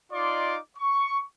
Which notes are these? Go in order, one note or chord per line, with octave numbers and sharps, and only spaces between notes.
D#4 F4 D5 D#5 C6 D6
C#6